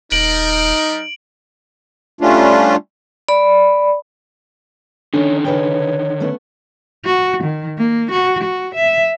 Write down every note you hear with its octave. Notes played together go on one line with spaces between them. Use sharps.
D#1 G3 D#4 A#4 D7 F#7
G3 A3 C#4 D4 F4
D5 B5
D3 D#3 C#4 D4 A4 C#5
C#3 B4 C#5 G5
A3 B3 C#4
F#4
D#3
A#3
F#4
F#4
E5